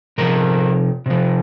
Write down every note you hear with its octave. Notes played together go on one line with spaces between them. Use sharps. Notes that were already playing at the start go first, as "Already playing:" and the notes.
C3 F3 A#4
C3 F3